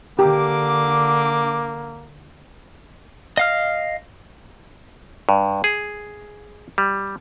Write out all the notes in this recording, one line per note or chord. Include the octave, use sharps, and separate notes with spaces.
D3 A#3 G4 D6
D#5 F5 F6
G2
G#4
G3